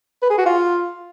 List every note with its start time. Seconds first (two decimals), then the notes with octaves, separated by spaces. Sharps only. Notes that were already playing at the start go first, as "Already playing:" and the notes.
0.22 B4
0.30 G#4
0.38 F#4
0.46 F4